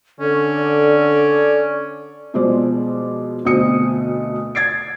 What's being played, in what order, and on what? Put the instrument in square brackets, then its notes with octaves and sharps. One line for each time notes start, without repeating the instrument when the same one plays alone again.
[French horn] D3 [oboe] C#4 [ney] A4 [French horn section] D5
[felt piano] B2 F3 G#3 C5 D5
D2 B2 D3 C4 D#6 C#7
G#6 A6 C7 D7